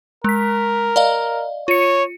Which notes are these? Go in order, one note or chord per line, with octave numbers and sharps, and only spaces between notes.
G#3 A#4 B6
D5 D#5 F5
F4 C#5 C#7